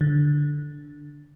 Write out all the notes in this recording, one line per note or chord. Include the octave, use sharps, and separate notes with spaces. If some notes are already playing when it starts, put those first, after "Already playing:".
D3